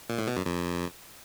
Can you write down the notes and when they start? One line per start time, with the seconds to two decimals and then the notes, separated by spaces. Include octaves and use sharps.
0.09 A#2
0.18 A2
0.28 B2
0.37 F#2
0.46 F2